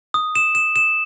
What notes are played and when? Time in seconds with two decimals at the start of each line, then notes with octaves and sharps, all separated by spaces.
0.14 D#6
0.35 E7
0.55 E7
0.76 E7